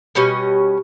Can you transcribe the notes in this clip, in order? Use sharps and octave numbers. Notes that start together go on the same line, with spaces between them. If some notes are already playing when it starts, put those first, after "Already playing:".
B2 G3 C#4 D#5